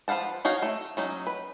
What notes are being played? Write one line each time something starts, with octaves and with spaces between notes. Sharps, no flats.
F3 B4 F5 F#5 A5
D#4 F#4 C#5 F5
A3
F#3 C#4 D#4
B4